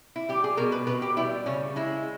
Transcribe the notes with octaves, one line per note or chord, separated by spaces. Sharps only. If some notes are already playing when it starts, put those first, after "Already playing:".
E4
G3 G4
G#4
B2 A#4
B4
B2 B4
G4
G3 E4
C#3 C#4
G#3 E4